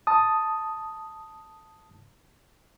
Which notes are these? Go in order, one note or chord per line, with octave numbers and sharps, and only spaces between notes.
A5 D#6